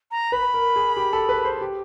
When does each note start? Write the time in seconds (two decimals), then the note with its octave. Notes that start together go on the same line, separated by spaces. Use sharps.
0.11 A#5
0.32 B4 B5
0.54 A#4
0.76 G#4
0.97 G4
1.13 A4
1.29 B4
1.45 C5
1.61 G4